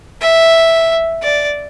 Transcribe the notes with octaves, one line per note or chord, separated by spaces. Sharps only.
E5
D5